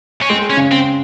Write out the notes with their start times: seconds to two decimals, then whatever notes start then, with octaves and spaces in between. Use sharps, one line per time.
0.22 C#4
0.29 G#3 C4
0.50 C#4
0.57 C#3
0.72 C4